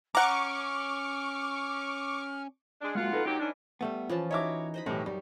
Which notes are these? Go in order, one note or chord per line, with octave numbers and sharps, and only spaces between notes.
C#4 F#5 A#5 C#6 D6 F6
G#3 D4
G#3 A#3 F4 F#4 F#5
D#4 A4 B4
A#2 F#3 D#4 G4
E3 C#4 D4
G3 A3 B3
E3 F3 C#4 A5
D#4 E4 F#4 C#5 E5 D6
C5 D#5 B5
B1 A2 E3 G4 C#5
F#2 G3